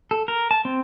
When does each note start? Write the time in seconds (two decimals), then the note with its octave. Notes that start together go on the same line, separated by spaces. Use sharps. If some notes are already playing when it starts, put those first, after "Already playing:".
0.11 A4
0.28 A#4
0.51 A5
0.65 C4